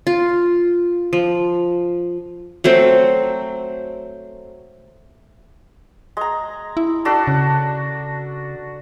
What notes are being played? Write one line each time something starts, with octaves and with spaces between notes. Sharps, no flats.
F4
F3
F#3 A3 C4
G#3 A#5
E4
D4 F#4 A4
C#3